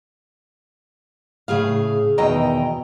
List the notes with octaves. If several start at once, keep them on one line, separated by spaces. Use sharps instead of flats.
A2 C#3 G#4 F5
E2 B2 D#3 D#5 G5 A#5